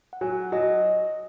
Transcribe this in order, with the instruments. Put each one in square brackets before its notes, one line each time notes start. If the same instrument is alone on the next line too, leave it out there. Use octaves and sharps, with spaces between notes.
[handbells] F#5
[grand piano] F#3 [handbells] G#5
[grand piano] F#3 [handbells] D#5